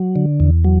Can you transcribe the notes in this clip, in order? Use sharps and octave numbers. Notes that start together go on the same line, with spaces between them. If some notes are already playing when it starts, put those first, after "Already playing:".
Already playing: F#3
D3
E2
F#3